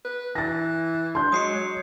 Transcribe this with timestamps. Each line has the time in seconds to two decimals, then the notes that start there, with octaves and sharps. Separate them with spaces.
0.05 B4
0.35 E3 A6 A#6
1.15 D4 C6 G6
1.32 F#3 G#3 D#6 C7 C#7
1.55 C#5